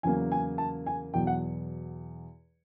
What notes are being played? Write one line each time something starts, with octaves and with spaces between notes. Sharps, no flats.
E2 C#3 F#3 A#3 C#4 G#5
G#5
A5
G#5
E2 B2 F#3 G5
F#5